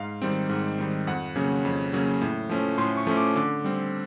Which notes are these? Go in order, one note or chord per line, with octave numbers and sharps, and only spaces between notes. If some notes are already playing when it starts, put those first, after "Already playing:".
Already playing: G#2 F5
D#3 G3 C4
G#2
D#3 G3 C4
F2 F#5
C#3 F#3 A#3 C#4
F2
C#3 F#3 A#3 C#4
A2
F3 A3 C#4
A2 C6
C#6
F3 A3 C#4
D6
D3 D6
G3 C4